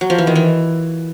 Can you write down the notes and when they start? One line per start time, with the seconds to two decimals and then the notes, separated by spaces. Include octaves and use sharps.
0.01 F#3
0.10 F3
0.18 E3
0.27 D#3
0.35 E3